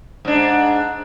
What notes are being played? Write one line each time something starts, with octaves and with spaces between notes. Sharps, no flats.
G#2 D4